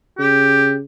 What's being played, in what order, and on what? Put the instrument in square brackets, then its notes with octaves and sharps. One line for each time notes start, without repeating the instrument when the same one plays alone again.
[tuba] C#3 [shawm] G4